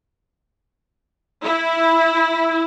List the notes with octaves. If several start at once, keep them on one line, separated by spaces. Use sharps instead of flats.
E4